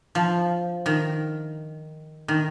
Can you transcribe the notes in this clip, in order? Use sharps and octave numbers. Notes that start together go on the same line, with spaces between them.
F3
D#3
D#3